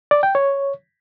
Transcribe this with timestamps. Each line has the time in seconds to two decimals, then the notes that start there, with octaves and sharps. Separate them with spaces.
0.11 D5
0.23 G5
0.35 C#5